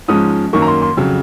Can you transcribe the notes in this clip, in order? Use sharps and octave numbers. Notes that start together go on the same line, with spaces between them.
G#2 F3 G#3 C#4 D#6
F#2 D#3 A#3 C#6
A#5
C6
C6
F2 C#3 F#3